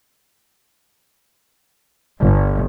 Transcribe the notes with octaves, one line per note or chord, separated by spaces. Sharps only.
G1